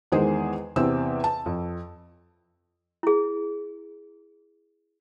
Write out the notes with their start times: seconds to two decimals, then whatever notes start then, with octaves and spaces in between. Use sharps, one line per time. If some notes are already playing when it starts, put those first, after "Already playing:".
0.12 E2 D#3 G#3 G#4 C5
0.76 E2 C3 C4 E6
1.24 A5
1.46 F2
3.03 E4 G#4